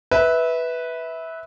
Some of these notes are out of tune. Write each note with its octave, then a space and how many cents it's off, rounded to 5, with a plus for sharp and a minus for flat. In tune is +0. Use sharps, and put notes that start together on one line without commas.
B4 +0 E5 -20